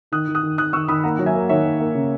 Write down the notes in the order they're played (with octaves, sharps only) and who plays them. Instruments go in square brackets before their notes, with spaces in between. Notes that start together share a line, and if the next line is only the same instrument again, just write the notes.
[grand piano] D#3 [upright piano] D#6 F#6
[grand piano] D#3
[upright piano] D#6 F#6
[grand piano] D#3
[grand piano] D#3 [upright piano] D#6 F#6
[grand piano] D#3 [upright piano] C#6 E6
[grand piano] D#3 [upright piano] B5 D#6
[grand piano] A#3 [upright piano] F#5 A#5
[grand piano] F#3
[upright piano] E5 G#5
[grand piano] A#3
[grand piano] D#3 [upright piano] C#5 E5
[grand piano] A#3
A#3
C#3